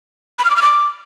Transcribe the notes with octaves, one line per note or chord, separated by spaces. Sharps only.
B5
F6
D6
F6
D6